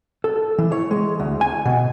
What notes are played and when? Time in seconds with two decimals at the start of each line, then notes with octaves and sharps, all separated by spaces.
0.24 A4
0.58 E3
0.72 C#5
0.91 G#3
1.20 D2
1.41 G#5
1.65 B2